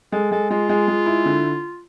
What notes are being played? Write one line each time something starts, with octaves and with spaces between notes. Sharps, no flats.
G#3 A4
G#3 A4
G#3 F4
G#3
G#3
E4
D3